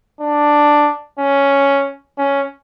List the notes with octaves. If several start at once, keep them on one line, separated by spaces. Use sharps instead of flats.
D4
C#4
C#4